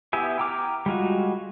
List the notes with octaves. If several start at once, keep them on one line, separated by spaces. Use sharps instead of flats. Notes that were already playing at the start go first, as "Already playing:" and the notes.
B3 E4 G4 E5 G#5
G5 A#5 D6 F6
G3 G#3 F4 F#4